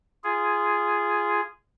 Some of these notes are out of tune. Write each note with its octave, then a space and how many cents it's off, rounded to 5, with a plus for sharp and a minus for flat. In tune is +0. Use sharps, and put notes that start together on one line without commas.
F4 -15 G#4 +0